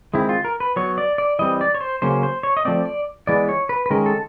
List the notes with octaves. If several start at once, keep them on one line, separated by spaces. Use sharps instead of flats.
D#3 G#3 C4 E4
F4
A#4
B4
F#3 B3 C#5
D5
D5
E3 G3 C4 D#5
D5
C#5
C5
C#3 F#3 A#3 C#4 C5
C5
C#5
D#5
F3 A3 C4 D5
D5
E3 G#3 B3 D5
C#5
B4
B4
D#3 G#3 C#4 A#4
A4